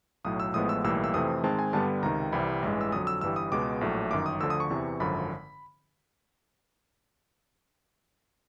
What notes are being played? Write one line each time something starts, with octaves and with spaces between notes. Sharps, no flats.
B1 A2 F#3 D#6
E6
A1 A2 F3 G#3 B3 D#6
E6
B1 A2 E3 G3 A#3 E6
E6
F2 C3 E3 A3 C4 D#6
G#2 D#3 G#3 C4 A5
G#5
G2 D3 G3 B3 A5
C#2 C3 D#3 A#5
C2 C3 E3 G3 B5
A1 G2 E3 G#3
E6
F2 D3 F#3 D#6
E6
G1 G2 E3 G3 E6
D#6
C#2 B2 G#3 B3 D6
A#1 A2 F#3 A3
G1 F#2 D#3 D6
D#6
D2 D3 F3 E6
D#6
C#6
E2 C3 E3
G#1 F#2 D3 F3 B5